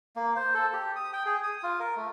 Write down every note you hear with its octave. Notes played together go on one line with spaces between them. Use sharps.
A#3
C5
A4
G4
D#6
G5
G#4
D#6
F4
A#4
A3